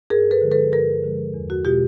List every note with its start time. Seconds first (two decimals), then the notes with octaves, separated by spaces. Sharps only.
0.10 G2 G#4 A#4
0.31 A4 B4
0.41 D3 F3 G#3
0.51 A4 B4
0.72 G2 G#4 A#4
1.03 D3 F3 G#3
1.34 E2
1.50 F#4
1.65 B2 G#3 F4 G4